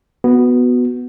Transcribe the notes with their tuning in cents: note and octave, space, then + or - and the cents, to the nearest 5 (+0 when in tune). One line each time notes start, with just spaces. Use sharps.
B3 +0 F#4 -5